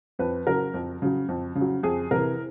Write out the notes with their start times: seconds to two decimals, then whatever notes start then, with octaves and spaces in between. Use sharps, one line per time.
0.19 F2 B4
0.47 C#3 F#3 A#4
0.74 F2
1.02 C#3 F#3
1.28 F2
1.55 C#3
1.61 F#3
1.83 F2 G#4
2.11 C3 E3 A#4